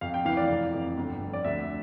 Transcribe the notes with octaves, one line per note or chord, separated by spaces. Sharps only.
F2 F5
G5
E3 F5
D5
F1
F2
G1
F2
D5
D2 E5